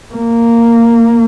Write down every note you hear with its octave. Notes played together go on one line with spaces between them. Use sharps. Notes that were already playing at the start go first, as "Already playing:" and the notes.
A#3